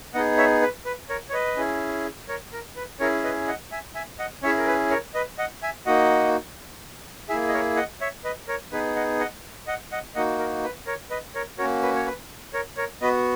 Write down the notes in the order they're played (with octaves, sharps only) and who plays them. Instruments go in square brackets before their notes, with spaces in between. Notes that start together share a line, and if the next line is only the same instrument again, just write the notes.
[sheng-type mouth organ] B3 D#4 G#4 D#5 F#5
C#5 E5
B4
B4
A#4 C#5
C#5
B4 D#5
C#4 E4 G#4
A#4 C#5
A#4
B4
C#4 E4 G#4 A#4 C#5
B4 D#5
D#5 F#5
E5 G#5
E5 G#5
D#5 F#5
C#4 E4 G#4 C#5 E5
A#4
B4
A#4 C#5
B4 D#5
D#5 F#5
E5 G#5
A#3 D#4 F#4 D#5 F#5
A#3 E4 G#4 E5 G#5
D#5
A#4 C#5
D#5 F#5
C#5 E5
B4 D#5
A#4 C#5
B3 D#4 G#4 B4
D#5 F#5
D#5 F#5
D#5 F#5
D#5 F#5
A#3 D#4 F#4 D#5 F#5
A#4
B4
A#4 C#5
B4 D#5
A#4 C#5
A#3 C#4 F#4 A#4 C#5
B4
C#5
B4
A#4 C#5
A#4 C#5
B3 F#4 B4 D#5